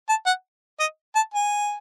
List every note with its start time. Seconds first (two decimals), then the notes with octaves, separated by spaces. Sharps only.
0.09 A5
0.26 F#5
0.80 D#5
1.15 A5
1.34 G#5